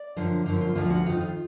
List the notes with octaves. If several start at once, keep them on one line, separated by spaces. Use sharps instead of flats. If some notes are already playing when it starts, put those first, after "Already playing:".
Already playing: D5
F#2 D3 F3
F#2 D3 F3
F4
D2 D3 F3 F4
F#4
F2 D#3 F4
F4